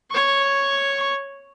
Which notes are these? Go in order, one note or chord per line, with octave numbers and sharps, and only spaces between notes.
C#5 C#6